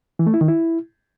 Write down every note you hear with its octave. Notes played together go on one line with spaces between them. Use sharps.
E3
A3
E4
D#3
E4